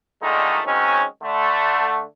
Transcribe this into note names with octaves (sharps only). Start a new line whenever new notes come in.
A#2 D3 D#3 G#3 A3 D#4
D#3 F#3 G#3 C4 C#4
D3 A3